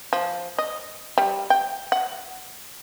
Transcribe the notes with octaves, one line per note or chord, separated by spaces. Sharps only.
F3
D#5
G3
G5
F#5